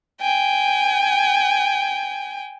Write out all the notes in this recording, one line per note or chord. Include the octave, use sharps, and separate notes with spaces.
G5 G#5